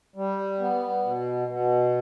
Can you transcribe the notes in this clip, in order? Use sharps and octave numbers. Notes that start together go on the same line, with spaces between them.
G3
B3
B2
B2